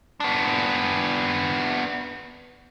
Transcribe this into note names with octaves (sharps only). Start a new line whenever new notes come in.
B3 D4